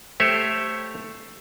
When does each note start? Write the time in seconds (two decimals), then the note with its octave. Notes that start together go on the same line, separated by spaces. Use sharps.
0.20 A3 G4 C5 C#5 E5